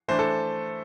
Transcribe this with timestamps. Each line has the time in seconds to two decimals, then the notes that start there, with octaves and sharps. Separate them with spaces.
0.08 E3 A3 D4 C5
0.19 A4